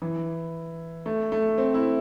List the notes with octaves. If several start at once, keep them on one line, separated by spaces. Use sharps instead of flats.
E3
A3
A3
C4
E4